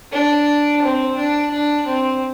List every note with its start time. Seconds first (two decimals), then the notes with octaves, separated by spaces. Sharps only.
0.12 D4
0.82 C4
1.17 D4
1.51 D4
1.86 C4